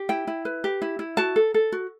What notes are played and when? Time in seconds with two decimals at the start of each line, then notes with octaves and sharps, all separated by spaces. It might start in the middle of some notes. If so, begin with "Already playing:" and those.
Already playing: G4
0.09 E4 G5
0.27 E4
0.45 B4
0.64 G4
0.82 E4
0.99 E4
1.17 F#4 A5
1.36 A4
1.54 A4
1.72 F#4